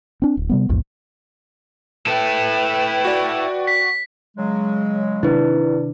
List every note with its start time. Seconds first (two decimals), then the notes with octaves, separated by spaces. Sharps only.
0.22 C4 D4
0.37 D1
0.49 C3 G3 B3
0.69 A#1 E2 G#2
2.07 E4 A4 B4 G5
3.05 F#4 D5
3.67 B6
4.37 C#3 F#3 G#3
5.23 C3 D#3 D4 E4 B4